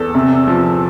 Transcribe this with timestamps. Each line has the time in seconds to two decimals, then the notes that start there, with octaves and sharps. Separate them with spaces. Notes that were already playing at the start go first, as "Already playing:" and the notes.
Already playing: E2 A4
0.15 C3
0.47 F3